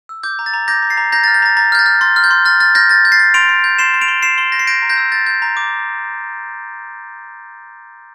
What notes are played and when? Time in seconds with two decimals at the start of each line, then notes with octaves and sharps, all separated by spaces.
0.09 E6
0.23 D6 G6
0.39 A#5
0.46 A6
0.54 A#5
0.68 D6 G6 A#6
0.82 A#5
0.90 A6 C7
0.97 A#5
1.12 A#5 G6 A#6
1.24 A6
1.28 F6
1.34 G6
1.42 A#5 A6
1.57 A#5 A6
1.72 F6 G6
1.79 A6
1.86 F6
2.01 C6 A6
2.16 F6
2.24 G6
2.31 C6
2.45 F6 A6
2.60 F6 A6
2.75 F6 G6 A#6
2.90 G6 A6
3.05 G6
3.12 A6 C7
3.19 G6
3.34 C6 D7 F7
3.49 C6
3.64 G6
3.78 C6 C7 E7
3.94 C6
4.01 D7 F7
4.08 C6
4.23 C6 C7 E7
4.38 C6
4.52 G6 A#6
4.59 C7
4.67 G6 A#6 D7
4.82 A#5
4.89 G6 A#6
4.97 E6
5.12 G6 A6
5.27 G6
5.42 A#5
5.57 D6